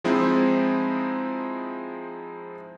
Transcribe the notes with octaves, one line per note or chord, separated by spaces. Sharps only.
F3 G#3 C4 D#4 E4